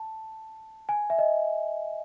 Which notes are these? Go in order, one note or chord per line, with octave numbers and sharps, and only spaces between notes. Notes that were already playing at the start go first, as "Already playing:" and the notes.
Already playing: A5
G#5
E5
D#5